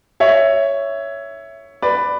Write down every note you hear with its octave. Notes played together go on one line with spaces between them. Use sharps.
C#5 E5
B4 D5